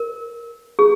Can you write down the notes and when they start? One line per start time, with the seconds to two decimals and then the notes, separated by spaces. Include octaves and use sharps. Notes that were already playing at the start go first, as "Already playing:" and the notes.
Already playing: A#4
0.79 G#4